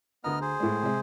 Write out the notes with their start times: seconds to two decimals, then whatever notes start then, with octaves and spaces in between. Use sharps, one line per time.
0.24 D2 B3 D#5 A#5 F6
0.41 G#4 C5
0.60 A2 G#3
0.83 C3 G#3